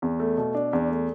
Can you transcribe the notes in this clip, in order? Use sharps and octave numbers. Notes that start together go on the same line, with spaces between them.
E2
A3
B2
D4
E2
A3